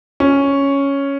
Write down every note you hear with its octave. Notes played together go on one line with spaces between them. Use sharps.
C#4